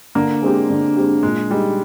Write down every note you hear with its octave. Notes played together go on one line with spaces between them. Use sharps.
D3 A#3
G#3 C4 G4
D3
G#3 C4 G4
A#2 G#3
G3 G#3 D#4